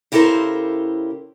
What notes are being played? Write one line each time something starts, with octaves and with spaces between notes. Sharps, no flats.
C#3 E4 G4 A4 A#4 C5